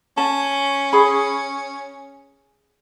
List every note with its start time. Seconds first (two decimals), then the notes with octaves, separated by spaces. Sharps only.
0.17 C#4 A5
0.93 G#4 B5